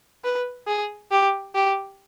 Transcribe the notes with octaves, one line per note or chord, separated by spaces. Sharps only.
B4
G#4
G4
G4